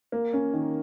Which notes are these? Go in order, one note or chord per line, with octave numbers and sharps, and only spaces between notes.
A#3
C#4
D#3